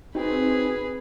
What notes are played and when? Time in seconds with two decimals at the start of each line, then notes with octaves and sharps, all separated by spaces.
0.15 C4 D#4 F#4 G#4 B4